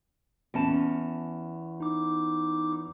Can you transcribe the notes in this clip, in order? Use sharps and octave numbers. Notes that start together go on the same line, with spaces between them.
E2 C#4 A5
D#4 D6